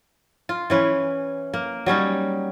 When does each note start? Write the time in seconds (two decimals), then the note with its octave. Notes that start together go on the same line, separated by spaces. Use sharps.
0.49 F4
0.70 E3 C#4 B4
1.54 A#3
1.86 F#3 G3 C#4 D#4